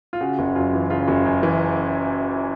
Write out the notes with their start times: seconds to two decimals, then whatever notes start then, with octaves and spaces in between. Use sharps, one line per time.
0.13 F4
0.21 C#3 F#4
0.39 F#1
0.55 F#2 F4
0.73 E3
0.90 C#3 F4
1.08 F#1
1.25 F#2
1.43 E3